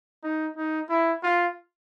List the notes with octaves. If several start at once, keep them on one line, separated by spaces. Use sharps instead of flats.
D#4
D#4
E4
F4